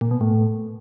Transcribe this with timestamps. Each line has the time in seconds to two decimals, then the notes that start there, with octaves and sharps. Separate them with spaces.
0.01 A#2
0.11 B2
0.21 A2